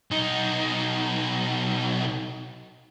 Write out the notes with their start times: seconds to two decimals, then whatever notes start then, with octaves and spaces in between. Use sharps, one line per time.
0.11 B1 D#4